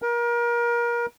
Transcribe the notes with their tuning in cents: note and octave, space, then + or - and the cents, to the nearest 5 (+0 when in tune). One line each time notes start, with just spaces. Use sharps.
A#4 +30